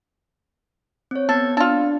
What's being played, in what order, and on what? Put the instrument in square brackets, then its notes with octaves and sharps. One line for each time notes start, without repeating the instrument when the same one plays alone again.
[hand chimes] C4 C#5
[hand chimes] B3 [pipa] A4 [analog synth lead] G#6
[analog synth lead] D4 [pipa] F4 A4